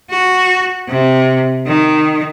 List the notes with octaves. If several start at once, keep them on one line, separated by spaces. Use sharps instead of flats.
F#4
C3
D#3